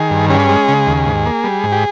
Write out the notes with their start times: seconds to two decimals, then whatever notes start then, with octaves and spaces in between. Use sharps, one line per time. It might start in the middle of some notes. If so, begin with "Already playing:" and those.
Already playing: D#3 G#4
0.11 G2
0.30 C#4 G#4
0.49 G#3
0.68 C#3
0.87 D#2
1.06 G#2
1.26 A#3
1.44 G3
1.63 G#2
1.72 G4